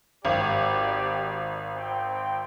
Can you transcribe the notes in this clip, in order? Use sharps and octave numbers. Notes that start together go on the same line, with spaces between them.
G#1 G4 D5
C4 G5